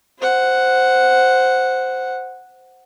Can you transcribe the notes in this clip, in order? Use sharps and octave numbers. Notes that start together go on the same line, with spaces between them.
C5 F#5